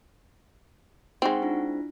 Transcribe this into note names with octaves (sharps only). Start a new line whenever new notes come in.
G#3 C4 D#4 F#5 C#6
D4 E4 F4